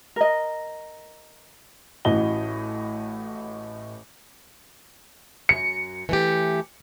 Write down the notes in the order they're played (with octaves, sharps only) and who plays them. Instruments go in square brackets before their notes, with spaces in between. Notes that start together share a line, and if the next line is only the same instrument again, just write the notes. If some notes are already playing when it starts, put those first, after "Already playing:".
[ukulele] A#4 D#5
[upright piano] A1 A2 E3 F#4 D#5 G7
[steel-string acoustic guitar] F#2 [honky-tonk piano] C#7
[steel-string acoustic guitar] E3 A3 G4